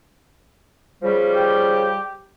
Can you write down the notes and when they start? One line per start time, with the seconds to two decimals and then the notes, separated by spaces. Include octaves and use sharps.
1.02 C#3 F3 G3
1.34 G4